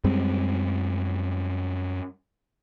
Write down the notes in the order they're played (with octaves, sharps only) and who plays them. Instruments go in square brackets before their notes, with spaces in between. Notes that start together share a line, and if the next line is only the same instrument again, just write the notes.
[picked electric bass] F#2 G3 G#3 C4